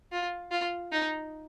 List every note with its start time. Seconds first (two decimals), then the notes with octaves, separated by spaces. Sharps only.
0.12 F4
0.51 F4
0.92 D#4